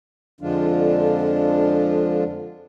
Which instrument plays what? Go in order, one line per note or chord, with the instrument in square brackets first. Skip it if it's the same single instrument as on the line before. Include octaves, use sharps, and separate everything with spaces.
[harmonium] F2 D3 F3 G#3 D4 F4